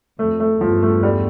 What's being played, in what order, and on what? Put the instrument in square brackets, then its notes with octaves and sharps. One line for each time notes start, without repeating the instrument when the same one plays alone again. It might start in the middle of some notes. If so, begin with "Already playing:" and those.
[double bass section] F2 [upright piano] A3
[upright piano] A3
[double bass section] E2 G2 [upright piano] F3
[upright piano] A3
G3